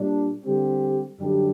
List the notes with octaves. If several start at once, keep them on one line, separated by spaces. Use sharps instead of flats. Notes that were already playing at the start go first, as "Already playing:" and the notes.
Already playing: A#2 G3 D4
D3 G3 C4 G4
F#2 D3 G3 D4 G4